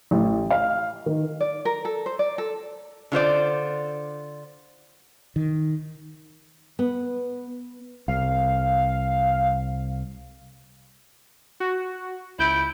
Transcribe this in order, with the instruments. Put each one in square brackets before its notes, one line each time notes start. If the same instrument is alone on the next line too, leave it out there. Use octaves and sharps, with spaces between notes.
[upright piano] A1
F5
D#3
[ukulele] D5
A#4
A4
C5
D5
A4
[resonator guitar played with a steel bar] D3 F4 C5 D5
[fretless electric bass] D#3
[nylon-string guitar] B3
[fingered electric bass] C2 [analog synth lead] F5
[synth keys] F#4
[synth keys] C#2 G6 D7 [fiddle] E4